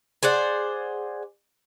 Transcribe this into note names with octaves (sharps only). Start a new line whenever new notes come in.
G#4 C5 D5 F#5